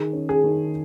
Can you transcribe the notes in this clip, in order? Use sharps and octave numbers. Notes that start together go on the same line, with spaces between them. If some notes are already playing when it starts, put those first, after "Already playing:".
Already playing: D#3 G#4
C#4
G#4
D#3